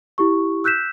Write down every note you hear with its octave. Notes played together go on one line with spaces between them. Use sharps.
E4 G4 C#6
E6 F#6 G6 B6 E7